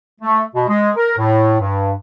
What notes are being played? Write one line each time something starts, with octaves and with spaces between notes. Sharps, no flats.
A3
B2
G#3
A#4
A2
G2